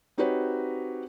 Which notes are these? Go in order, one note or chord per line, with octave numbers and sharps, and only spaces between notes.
C4 D#4 F#4 G4 B4 C#5